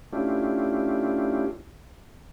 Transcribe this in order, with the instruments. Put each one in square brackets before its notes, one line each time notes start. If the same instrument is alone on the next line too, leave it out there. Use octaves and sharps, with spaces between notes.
[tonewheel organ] A3 C#4 D4 E4 F4 G4